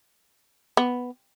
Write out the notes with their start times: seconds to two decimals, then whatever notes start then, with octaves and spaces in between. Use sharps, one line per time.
0.77 B3